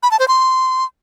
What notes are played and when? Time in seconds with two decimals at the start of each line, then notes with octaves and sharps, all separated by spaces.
0.03 B5
0.11 A5
0.20 C5
0.28 C6